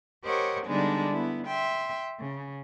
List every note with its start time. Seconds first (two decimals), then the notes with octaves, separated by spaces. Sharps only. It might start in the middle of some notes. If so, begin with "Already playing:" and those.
0.23 G4 A#4 C5 C#5 D#5 F#5
0.65 D3 G3 G#3 B3 D4 D#4
1.10 B3 E4
1.46 E5 G5 C6
2.18 C#3